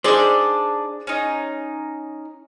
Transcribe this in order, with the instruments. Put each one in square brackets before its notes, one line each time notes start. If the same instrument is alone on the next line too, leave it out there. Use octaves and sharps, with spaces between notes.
[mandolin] D4 D#4 D5 [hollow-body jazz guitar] G#4 C5
[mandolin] C#4 D#4